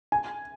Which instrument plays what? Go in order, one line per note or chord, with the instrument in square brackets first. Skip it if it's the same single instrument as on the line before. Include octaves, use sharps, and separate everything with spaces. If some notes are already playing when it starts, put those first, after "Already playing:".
[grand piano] G#5